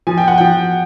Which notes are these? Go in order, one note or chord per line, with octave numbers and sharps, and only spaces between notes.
F3 G#5
G5
F#5
F3 G5